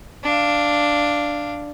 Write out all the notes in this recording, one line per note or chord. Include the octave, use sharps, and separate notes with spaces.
D4 F5